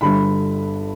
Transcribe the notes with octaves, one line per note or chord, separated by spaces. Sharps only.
G1 G2 D3 B5